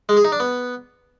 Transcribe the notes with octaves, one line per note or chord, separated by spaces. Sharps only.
G#3
G#4
D#4
D4
B3